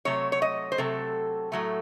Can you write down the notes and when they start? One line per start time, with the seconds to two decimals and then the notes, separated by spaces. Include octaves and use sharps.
0.05 C3 F#3 A3 C#5
0.32 C#5
0.42 D#5
0.72 C5
0.78 C3 F#3 A3 A4
1.52 A2 F#3 A3